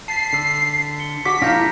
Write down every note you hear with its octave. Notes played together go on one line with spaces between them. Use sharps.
A5 A6 B6 C7
D3 E6
C#7 G7
F#4 D6 B6
A#1 D4 E4 F5 A#5 G6 A#6